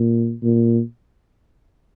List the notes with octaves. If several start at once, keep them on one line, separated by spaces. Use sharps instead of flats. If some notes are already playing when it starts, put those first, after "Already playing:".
Already playing: A#2
A#2